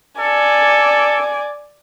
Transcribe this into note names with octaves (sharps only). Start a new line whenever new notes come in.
A4 D5 G#5